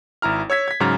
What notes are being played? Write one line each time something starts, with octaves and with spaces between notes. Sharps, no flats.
G#1 E4 A#5 F6
C#5 E6 G#6 B6
G#6 B6
G#2 C#3 F#3 A#5 F6 A6